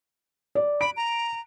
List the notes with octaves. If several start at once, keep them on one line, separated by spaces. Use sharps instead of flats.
D5
B5 D7
A#5